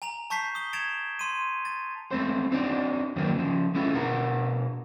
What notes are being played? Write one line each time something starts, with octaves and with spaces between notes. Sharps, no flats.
G#5 A#5 F7
A5 C#6 G6 B6 C7
D#6 G7
G#6 A6 C#7 D7 E7 F7
C6 D#7
A6
G#3 A3 C4 C5
C4 D4 D#4 F#4 D5
G#2 D#3 F#3 A#3 D4
C#3 F3
G#3 A3 C#4 E4 F4
B2 D4 A#4 F#5 A#5